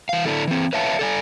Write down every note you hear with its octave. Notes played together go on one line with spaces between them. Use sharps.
E3 F5
D3 D4 E4 A4
E3 C4
B4 C#5 E5 F5 A5
A4 D5 G#5